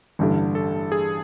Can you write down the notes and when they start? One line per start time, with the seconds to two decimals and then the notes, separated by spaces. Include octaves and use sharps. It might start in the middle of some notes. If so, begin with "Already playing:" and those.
0.19 A1 G2 D3
0.55 A4
0.92 G#4